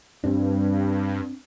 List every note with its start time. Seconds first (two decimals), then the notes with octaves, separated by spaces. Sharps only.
0.24 G2 C4 D4